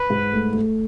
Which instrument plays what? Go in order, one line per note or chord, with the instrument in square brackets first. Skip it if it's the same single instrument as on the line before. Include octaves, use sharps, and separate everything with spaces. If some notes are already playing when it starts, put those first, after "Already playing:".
Already playing: [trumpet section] B4
[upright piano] G#2
A3
A3